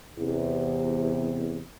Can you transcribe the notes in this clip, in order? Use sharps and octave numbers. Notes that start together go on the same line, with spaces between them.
E2 C3